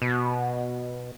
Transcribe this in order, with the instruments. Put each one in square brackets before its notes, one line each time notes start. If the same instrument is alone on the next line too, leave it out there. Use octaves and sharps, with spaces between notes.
[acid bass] B2